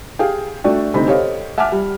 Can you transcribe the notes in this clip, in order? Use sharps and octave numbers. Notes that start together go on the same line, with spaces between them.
G4 G#4 F5 G5
A3 D4 F#4 A4 D5 G5
D2 C3 C4 D#4 B5
G4 A4 C5 C#5 D#5 F5
E5 F#5 G#5 A5 D6 F6
G3